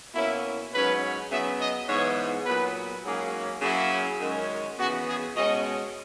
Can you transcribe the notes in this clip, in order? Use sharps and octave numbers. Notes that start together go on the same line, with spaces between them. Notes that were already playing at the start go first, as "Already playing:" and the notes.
B2 A#3 C#4 E4
G#2 F#3 C#4 B4
C#3 F#3 B3 E5
D#5
G#2 E3 B3 C#5
A#2 F#3 B3 B4
G#2 F#3 A#3 C#4 G#4
C#3 F#3 A#3 C#4 E4
F#2 D#3 G#3 C#4
C#3 E3 B3 F#4
G#4
B2 G#3 C#4 D#5